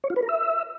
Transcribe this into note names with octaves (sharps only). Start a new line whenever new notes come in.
C#5
F4
B4
A#4
E5